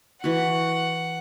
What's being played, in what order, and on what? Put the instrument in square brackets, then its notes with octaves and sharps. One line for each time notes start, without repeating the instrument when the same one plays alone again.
[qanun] E3 F#4 [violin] F#5